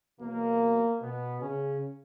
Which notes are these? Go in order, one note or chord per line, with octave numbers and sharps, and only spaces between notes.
E2 B2 F#3 A#3
B2 B3
C#3 C#4